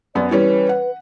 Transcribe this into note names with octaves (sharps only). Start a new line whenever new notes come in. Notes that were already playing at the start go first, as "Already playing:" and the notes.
F#2 B3 D5
E3 G3 C#4 B4
F#5